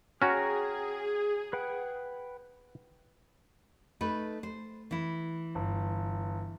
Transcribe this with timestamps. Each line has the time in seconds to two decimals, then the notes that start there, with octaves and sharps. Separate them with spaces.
0.22 C#4 F#4 G#4 G5 A#5 F6
1.53 B4 F#5 G5
4.01 A3 D#4 B4
4.43 C5
4.91 E3 E4
5.55 G1